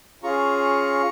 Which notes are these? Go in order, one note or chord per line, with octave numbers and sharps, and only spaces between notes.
C#4 F4 G#4 A#5 C#6